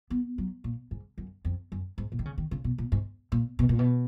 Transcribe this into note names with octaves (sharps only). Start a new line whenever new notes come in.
B3
F#3
A#2
G#2
F#2
F2
F#2
G#2
A#2
D#3
C#3
D#3
C#3
B2
A#2
G#2
A#2
B2
A#2
B2